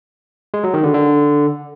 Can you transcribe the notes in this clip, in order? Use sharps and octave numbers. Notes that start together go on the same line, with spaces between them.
G#3
F#3
D#3
D3
D3